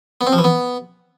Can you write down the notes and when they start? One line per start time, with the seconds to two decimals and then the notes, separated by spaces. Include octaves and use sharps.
0.21 B3
0.27 C4
0.33 F3
0.38 E3
0.44 B3